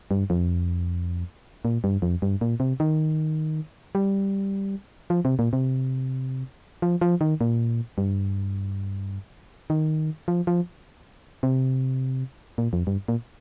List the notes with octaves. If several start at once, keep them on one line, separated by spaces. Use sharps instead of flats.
G2
F2
A#2
G2
F2
G2
A#2
C3
D#3
G3
F3
C3
A#2
C3
F3
F3
D#3
A#2
G2
D#3
F3
F3
C3
A#2
F2
G2
A#2